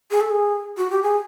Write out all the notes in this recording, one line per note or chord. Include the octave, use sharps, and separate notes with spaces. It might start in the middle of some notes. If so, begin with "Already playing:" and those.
G#4
A4
G#4
F#4
G4
G#4